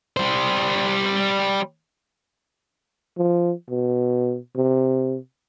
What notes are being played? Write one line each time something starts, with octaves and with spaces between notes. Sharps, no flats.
G3 C5
F3
B2
C3